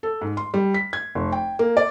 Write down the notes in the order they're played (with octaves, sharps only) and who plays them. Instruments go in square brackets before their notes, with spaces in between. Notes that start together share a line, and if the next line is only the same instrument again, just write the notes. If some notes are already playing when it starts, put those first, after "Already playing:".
[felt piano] A4
G#2
C6
G3
B6
G#6
F1
G5
A#3
D5